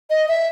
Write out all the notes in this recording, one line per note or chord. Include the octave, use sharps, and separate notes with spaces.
D#5
E5